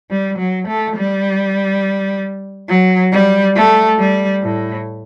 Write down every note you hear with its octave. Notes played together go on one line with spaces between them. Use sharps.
G3
F#3
A3
G3
F#3
G3
A3
G3
A2